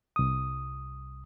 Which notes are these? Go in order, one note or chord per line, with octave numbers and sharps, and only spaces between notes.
C2 D#6